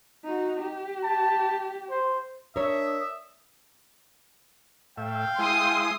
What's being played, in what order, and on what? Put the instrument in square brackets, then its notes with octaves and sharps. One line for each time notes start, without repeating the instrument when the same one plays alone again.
[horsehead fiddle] D#4 F#4
G4
[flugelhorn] A5
C5
[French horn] D4 [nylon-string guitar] A#4 C#5 [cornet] E5 [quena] D#6
[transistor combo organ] A2 E5 [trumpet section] F5 G5
[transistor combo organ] G#3 E4 [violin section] C6 D#6